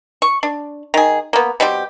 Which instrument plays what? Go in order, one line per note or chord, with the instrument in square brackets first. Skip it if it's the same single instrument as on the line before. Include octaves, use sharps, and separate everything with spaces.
[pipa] C#6
D4
D#3 G#4
A#3 B3
B2 G3 C4 G4